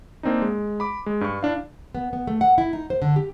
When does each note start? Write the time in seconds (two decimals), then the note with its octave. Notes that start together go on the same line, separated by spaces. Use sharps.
0.23 A#3 C4 D4 D#4
0.42 G#3
0.80 B5 D6
1.06 G#3
1.21 G2 C#6
1.43 D4 E4 F5
1.95 B3
2.13 B3
2.27 A3
2.41 F#5
2.58 E4
2.73 D#4
2.90 C5
3.02 D3
3.16 G4